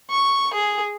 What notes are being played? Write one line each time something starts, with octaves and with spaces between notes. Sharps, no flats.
C#6
G#4